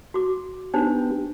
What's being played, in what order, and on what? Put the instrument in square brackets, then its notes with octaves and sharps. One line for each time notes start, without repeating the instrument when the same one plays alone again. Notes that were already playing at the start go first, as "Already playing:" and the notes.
[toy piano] F#4 D6
[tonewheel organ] B3 G4 [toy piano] D4 D#4 C5